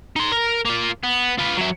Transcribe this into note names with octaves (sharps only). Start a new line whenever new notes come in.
D#4 C6
A#4
A#3 F4
B3
F4 B4
F#3 E5